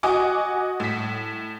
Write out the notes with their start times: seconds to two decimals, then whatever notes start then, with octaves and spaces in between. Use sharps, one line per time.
0.03 F#4 D#5 F#5 G#5 D6
0.80 A2 B6